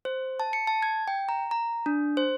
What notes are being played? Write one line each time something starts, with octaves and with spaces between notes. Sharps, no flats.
C5
A5
C#7
A5
G#6
G5
A#5
A#5
D4
C5